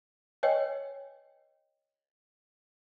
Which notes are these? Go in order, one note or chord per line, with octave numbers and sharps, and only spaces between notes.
B4 C#5 D#5 G5 G#5